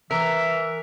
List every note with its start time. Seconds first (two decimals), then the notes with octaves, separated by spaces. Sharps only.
0.11 E3 A#4 E5